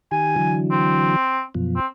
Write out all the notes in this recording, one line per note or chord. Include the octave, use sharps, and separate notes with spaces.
D#3 G4 G#5
D3 E3 F#3
C4
F#2 B2 F3
C4